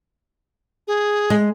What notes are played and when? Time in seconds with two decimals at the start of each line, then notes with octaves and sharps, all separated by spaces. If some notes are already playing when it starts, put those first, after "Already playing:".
0.88 G#4
1.30 G#3